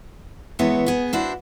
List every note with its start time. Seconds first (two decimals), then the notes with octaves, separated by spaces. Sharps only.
0.59 E2 E3 G#3 B3 E4 C#5
0.86 B3 G#4
1.13 D4 E4 F#4 C5